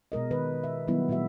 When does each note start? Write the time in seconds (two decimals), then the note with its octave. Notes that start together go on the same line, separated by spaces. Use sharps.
0.12 B2 G#3 A#4 D#5
0.31 D#3 B4
0.64 E5
0.88 D#3 F#3 G3 B3 E4
1.09 A#2 F#3 G#3 F#4 E5